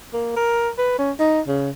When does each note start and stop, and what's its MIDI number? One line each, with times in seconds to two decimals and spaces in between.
0.13 0.34 58
0.36 0.69 70
0.78 0.96 71
0.99 1.12 61
1.20 1.41 63
1.48 1.70 49